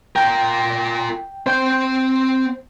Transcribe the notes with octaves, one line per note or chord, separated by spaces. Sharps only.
F4 A#4 G5
C4 C5 G5 G6